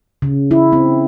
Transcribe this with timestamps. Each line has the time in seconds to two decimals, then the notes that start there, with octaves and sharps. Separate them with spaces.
0.22 C#3
0.51 E4
0.73 C4